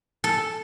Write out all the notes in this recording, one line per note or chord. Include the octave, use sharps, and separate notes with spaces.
A4